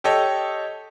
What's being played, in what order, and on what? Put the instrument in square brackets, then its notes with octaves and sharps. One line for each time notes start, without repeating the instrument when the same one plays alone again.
[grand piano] G4 A4 C#5 D#5